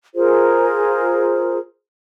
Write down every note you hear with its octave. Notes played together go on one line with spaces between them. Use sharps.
F4 G#4 A#4 C5